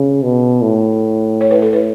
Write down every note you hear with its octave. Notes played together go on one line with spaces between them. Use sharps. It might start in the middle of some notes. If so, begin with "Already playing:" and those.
Already playing: C#3
B2
A2
C#5
B4
A4
B4